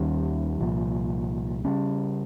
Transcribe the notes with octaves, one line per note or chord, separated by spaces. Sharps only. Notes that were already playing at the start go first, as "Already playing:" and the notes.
Already playing: D#2 D#3 G3 C#4
C2 A#2 F3
C#3 G3 C#4